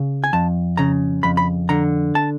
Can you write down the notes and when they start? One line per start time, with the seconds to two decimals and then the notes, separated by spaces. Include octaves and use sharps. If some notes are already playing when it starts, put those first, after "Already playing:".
Already playing: C#3
0.24 G#5
0.33 F2 A5
0.77 C#3 A#5
1.23 F2 B5
1.37 B5
1.69 D3 A#5
2.15 A5